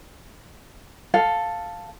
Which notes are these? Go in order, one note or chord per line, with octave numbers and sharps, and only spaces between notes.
A4 F5